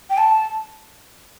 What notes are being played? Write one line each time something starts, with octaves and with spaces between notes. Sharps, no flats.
G5
A5